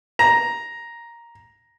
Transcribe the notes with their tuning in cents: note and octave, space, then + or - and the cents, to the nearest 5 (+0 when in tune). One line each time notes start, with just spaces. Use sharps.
A#5 +5